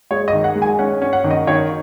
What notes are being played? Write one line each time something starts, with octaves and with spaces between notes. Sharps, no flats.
G#3 C#5
D#5
D#3
F#5
G#3
G#5
C#4 F#5
C#4
F#5
D#3
D#5
D#3 C#5